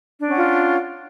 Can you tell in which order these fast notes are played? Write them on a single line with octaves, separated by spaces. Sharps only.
D4 C#4 F#5 F4